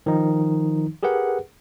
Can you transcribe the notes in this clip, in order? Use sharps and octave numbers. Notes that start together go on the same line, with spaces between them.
D#3 F3 D#4
G4 G#4 A#4 B4 F#5